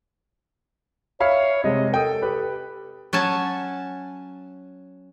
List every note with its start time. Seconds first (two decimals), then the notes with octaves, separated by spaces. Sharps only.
1.20 C#5 E5 F5 B5
1.64 C3 G#3 D#5
1.92 A4 A#4 G5 D#6
2.22 G4 B4
3.13 F#3 C#4 G#5 A5